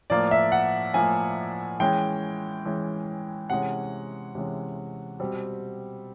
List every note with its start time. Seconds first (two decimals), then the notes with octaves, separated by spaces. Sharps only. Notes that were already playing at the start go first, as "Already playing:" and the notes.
0.10 A2 F3 A#3 D5
0.31 E5
0.52 F#5
0.94 A2 F3 A#3 G#5
1.80 E3 G#3 C#4 G5
2.65 E3 G#3 C#4
3.50 C3 E3 G#3 C#4 F#5
4.35 C3 E3 G#3 C#4
5.20 B2 G3 C4